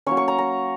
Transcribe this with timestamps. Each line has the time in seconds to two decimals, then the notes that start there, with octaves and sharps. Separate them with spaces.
0.06 F#3 A#3 C#4 C#6
0.17 C#6
0.28 A#5
0.38 A#5